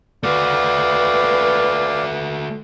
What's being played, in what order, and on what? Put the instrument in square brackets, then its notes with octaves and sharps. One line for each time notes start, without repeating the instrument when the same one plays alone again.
[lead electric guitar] A3 F#4 [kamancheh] B4 [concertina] D5 F5